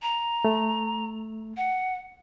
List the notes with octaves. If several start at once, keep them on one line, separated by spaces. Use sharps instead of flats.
A#5
A3
F#5